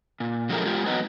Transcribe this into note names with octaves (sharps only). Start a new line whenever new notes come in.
A#2
D3 F3 F#3 G#3 A3 A#4
G#3 F4 G4
E2 F#3 B3 D#4